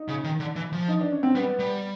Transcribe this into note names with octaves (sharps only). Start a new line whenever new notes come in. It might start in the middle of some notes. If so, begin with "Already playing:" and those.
Already playing: D#4
C#3
D#3
D3
E3
F3
D#4
D4
C#4
C4
G3 B3
G3